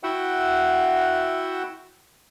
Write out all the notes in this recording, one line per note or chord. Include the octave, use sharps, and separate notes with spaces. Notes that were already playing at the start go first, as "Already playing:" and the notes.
E4 F#4 E5 F#5 G5